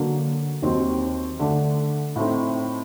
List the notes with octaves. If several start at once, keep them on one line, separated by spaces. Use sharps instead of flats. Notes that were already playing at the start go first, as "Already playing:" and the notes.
Already playing: D3 F#3 A#3 D4
D#2 D#3 F#3 C4
D3 A3 D4
A2 A3 C4 D#4